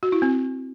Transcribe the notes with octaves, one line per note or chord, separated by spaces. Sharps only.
F#4
E4
C4